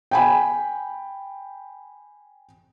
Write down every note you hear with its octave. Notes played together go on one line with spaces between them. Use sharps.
G5 G#5 B5